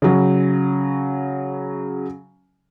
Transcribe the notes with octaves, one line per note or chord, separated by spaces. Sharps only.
C#3 F#3